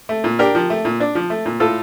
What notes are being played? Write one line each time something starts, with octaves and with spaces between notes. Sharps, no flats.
A3
A#2
D4 G4 A#4
F3
A3
A#2
D4
F3
A3
A#2
A2 F4 A4